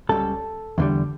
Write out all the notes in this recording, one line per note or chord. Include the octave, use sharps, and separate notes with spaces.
C#2 C#3 G3 A4
E2 D3 G3